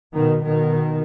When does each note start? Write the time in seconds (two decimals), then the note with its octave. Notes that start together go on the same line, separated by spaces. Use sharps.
0.14 B2 D#3
0.43 B2 D#3